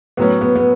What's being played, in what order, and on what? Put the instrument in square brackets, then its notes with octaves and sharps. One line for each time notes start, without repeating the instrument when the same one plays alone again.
[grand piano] A2 F#3 C#4 [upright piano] B3
[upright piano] B3
B3